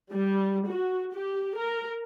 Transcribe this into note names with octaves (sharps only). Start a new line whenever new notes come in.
G3
F#4
G4
A#4